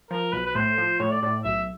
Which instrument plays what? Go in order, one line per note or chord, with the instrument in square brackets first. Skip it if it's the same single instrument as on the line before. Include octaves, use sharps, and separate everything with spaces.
[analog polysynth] F3 [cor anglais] A#4
[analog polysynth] B1 [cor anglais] B4
[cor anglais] B4
[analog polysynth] A2 [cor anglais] C5
[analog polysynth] F3
[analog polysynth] A2 [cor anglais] C#5
[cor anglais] D5
[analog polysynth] A2 [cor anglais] D5
[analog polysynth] B1 [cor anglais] E5